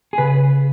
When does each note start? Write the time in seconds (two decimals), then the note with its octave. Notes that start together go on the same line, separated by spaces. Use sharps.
0.13 G#4
0.18 C#3 B4